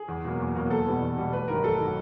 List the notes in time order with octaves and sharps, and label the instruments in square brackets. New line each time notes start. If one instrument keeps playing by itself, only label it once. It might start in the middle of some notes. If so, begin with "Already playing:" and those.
Already playing: [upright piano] G#4
E2
B2 F#3 A#3
E2
B2 F#3 A#3
E2 A4
B2 G3 B3
E2
B2 G3 B3
A1 B4
G2 D#3 F#3 A#4
A1 A4
D#3 F#3